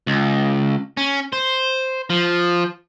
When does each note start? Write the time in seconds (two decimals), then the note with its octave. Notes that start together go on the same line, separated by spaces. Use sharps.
0.07 C#2
0.97 C#4
1.33 C5
2.10 F3